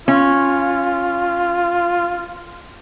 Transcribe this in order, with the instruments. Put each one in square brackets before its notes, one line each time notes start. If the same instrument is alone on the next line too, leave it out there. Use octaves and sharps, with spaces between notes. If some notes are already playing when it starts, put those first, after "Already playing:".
[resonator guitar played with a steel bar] C#4 [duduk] F4